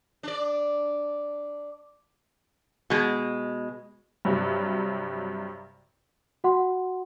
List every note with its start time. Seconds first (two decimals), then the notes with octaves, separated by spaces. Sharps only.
0.23 D4 D5
2.90 B2 G#3
4.25 G2 C3 F#3
6.44 F#4 F#5 C6